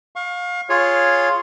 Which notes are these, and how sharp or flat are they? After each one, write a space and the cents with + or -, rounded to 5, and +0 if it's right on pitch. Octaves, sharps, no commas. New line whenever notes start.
F5 +30 C#6 -10
F4 +0 G#4 +0 C#5 +0